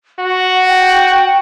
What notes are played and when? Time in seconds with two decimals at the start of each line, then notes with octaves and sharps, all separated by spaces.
0.20 F#4 F#5
0.68 G5